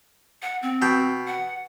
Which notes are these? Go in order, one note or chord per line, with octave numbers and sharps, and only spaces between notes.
F#5
C4
B2 G5
F#5